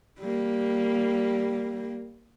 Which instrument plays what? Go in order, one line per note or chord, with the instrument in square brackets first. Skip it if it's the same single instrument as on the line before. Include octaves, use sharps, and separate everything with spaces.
[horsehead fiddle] G3 A#3